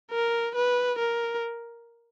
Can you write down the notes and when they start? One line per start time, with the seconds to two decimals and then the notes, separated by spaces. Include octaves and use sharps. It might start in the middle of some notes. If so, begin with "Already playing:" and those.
0.11 A#4
0.55 B4
0.99 A#4